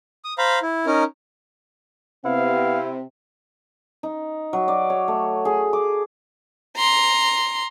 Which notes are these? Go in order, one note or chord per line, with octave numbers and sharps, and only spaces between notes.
D#6
C5 F5 A#5 B5
E4
C#4 D#4 A#4
C3 B3 C4 E4 F5
D#4
F#3
D5
C#5
A3
G#4
D6
A#5 C6